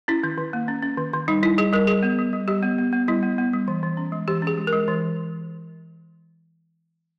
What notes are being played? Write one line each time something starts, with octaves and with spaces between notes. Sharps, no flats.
C#4 E4
D#3
D#3
A#3
C#4
C#4
D#3
D#3
G3 D#4
G3 E4
G3 G#4
G3 A#4
G3 G#4
B3
G3
G3
G3 G4
B3
B3
B3
G3 E4
B3
B3
G3
E3
E3
C#4
G#3
E3 G4
C#4
G#4
G#3
A#4
G#3
E3